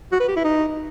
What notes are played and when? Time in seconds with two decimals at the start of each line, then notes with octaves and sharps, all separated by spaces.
0.12 F#4
0.20 B4
0.28 G4
0.36 E4
0.44 D#4